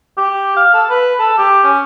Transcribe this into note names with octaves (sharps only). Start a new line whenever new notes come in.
G4
F5
A4
B4
A4
G4
C#4